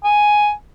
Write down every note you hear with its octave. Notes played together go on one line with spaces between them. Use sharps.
G#5